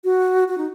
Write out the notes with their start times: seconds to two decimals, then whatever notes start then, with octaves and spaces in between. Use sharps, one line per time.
0.04 F#4
0.48 F#4
0.58 D#4